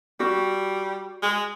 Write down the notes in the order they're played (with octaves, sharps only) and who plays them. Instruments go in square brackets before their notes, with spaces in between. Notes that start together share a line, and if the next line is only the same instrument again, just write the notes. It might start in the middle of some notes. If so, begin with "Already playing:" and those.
[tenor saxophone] G3 [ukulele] F#4
[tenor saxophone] G#3